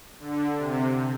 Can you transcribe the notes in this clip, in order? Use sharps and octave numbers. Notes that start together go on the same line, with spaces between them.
D3
C3